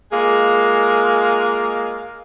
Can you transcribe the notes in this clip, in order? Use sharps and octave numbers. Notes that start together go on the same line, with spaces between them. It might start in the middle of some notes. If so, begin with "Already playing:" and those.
G#3 A#3 F4 G#4